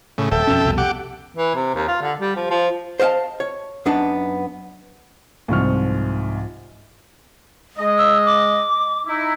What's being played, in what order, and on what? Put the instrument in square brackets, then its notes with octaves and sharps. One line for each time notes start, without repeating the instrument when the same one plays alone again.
[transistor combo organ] A2 C#3
[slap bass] D#1 [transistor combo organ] A4 E5 G5
[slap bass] F2 B2 C#4
C2 F2 B2
[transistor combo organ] G4 F#5 D6
[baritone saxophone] E3
C3
D#2
F4
D3
G3
F3
F3
[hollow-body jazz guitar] C5 D#5 F5 G5 A5
C#5
F#2 B3 D4 D#4 A5
[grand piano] C2 G#2 F3 C#6 F6
[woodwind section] G#3 D#5
[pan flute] E6
D6
[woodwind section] D#4 E4